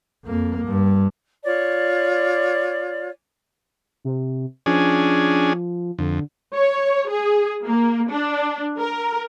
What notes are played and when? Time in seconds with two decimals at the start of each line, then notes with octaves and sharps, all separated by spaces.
0.24 F2 A#3
0.66 G2
1.44 F4 C#5 D5
4.04 C3
4.66 F3 C#4 D4 G#4
5.99 F2 D3
6.55 C#5
7.10 G#4
7.67 A#3
8.09 D4
8.80 A#4